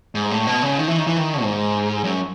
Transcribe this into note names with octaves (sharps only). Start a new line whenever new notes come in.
G#2
A2
B2
C#3
D#3
E3
D#3
E3
D#3
G#2
F#2